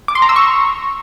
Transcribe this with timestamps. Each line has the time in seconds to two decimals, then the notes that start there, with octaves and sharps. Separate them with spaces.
0.08 D6
0.15 C6
0.22 A#5
0.29 E6
0.36 C#6